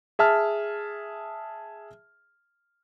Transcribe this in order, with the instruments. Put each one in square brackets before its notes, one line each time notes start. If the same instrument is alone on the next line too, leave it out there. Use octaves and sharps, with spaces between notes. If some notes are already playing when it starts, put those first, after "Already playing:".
[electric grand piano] G#4 E5 A5 F6